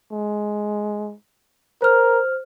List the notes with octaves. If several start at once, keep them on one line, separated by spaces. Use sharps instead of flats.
G#3
A#4 C5 F6